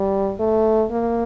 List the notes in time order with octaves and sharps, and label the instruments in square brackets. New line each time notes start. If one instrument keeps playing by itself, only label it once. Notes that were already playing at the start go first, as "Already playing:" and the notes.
Already playing: [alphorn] G3
A3
A#3